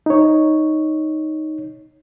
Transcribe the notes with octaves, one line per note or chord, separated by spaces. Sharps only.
D#4 C#5